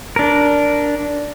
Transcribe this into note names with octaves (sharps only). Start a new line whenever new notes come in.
D4 A#4